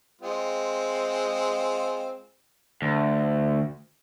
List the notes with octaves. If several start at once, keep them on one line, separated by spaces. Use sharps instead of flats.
G#3 C4 F4
D2 D3